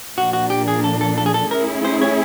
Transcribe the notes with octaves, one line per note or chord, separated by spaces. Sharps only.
A#2 F3 A#3 D4 F#4
F#4
G4
G#4
A4
A4
A4
G#4
A4
A3 C#4 E4 G#4 A#4
C5
C#5